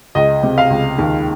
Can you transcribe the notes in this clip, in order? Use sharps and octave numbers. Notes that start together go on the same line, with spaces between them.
C#2 D#5
C3
F5
C#2
D#2